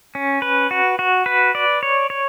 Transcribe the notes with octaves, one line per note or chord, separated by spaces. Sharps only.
C#4
B4
F#4
F#4
B4
D5
C#5
C#5